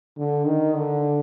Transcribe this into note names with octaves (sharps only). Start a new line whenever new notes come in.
D3
D#3
D3